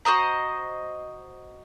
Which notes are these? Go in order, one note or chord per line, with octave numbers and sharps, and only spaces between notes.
F#4 C5 D#5 A#5